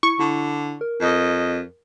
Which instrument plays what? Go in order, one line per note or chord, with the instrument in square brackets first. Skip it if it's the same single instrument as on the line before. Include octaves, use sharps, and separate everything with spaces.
[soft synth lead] E4 [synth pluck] C#6
[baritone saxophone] D3 [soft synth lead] E4
[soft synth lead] A#4
[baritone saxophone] F2 [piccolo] D#5